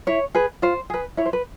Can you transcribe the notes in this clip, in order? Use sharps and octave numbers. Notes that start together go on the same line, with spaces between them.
E4 C#5
G#4 B4
F4 C5
G#4 B4
E4 C#5
C5
B4